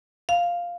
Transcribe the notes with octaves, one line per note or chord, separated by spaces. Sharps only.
F5